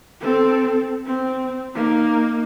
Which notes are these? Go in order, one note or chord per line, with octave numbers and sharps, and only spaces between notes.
C4 A4
C4
A#3 D#4